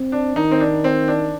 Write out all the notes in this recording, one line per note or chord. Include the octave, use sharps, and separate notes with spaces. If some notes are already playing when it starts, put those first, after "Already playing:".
Already playing: C4
D4
D#3 D#4
C4
D4
C4
D4